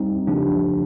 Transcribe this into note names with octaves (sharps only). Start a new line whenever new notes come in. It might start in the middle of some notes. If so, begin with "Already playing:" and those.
Already playing: G3 C4 D#4
C#3 F3 A3 D4 G4